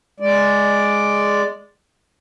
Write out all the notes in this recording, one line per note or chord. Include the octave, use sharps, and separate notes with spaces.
G#3 D5